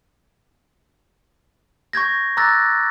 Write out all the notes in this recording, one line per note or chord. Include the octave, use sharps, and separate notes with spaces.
C#6 G6 G#6 A#6
A#5 D6 E6 F#6 A6 A#6